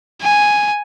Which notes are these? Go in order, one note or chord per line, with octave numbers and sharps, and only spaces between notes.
G#5